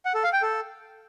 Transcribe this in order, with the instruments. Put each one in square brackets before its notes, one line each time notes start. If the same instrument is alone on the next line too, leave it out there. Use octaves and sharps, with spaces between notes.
[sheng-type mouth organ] F#5
A4
F5
G5
A4